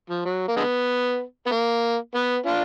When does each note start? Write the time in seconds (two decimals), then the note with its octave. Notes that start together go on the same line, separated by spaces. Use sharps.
0.10 F3
0.25 F#3
0.48 A#3
0.57 D3 G#3 B3
1.47 B3
1.51 A#3
2.15 B3
2.46 D4 F4